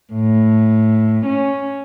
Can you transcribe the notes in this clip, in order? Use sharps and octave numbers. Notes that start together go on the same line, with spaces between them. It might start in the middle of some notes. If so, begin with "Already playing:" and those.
A2
C#4